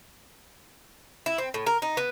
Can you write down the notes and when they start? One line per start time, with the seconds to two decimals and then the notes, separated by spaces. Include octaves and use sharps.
1.26 E4
1.38 C4
1.54 A2
1.66 A#4
1.82 D#4
1.97 B3